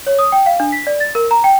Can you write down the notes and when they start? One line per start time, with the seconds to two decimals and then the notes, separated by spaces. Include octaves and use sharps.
0.07 C#5
0.19 D#6
0.32 G5
0.46 F5
0.60 D4
0.72 B6
0.87 D5
1.00 A6
1.15 A#4
1.31 A#5
1.44 G5